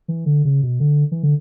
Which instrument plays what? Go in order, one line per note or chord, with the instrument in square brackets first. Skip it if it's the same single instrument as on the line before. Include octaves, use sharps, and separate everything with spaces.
[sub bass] E3
D3
C#3
B2
D3
E3
D3